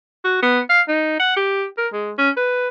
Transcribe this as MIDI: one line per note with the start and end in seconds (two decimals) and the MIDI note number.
0.25 0.42 66
0.42 0.60 59
0.70 0.81 77
0.89 1.16 63
1.20 1.34 78
1.37 1.65 67
1.78 1.88 70
1.93 2.12 56
2.18 2.30 61
2.37 2.69 71